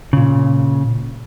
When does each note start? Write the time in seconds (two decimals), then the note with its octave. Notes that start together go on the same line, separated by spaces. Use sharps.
0.13 A#2 C#3